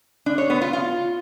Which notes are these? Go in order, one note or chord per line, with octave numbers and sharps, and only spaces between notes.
D4
C#5
B3
F4
F4